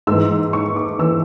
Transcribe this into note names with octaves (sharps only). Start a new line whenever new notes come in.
G#2 E3 E6
C#6
D6
E3 E6